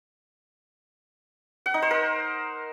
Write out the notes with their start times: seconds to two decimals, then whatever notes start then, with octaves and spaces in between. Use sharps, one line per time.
1.66 F#5
1.74 D#4
1.82 C5
1.91 A#4